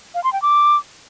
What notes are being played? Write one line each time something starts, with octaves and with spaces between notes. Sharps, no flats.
F5
C6
G5
D6